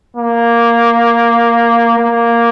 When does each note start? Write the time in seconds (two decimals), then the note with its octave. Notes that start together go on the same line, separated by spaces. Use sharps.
0.17 A#3
1.98 A#3